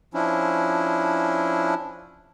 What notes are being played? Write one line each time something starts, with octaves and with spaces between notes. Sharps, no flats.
F3 C#4 D4 E4